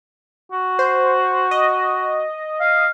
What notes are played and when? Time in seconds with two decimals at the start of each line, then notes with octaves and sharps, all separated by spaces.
0.52 F#4
0.79 C5
1.51 D#5
2.61 F5